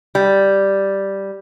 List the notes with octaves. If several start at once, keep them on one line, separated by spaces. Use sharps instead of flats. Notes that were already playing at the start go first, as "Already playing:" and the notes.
G3